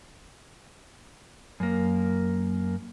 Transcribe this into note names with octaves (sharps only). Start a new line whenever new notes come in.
F#2 A#3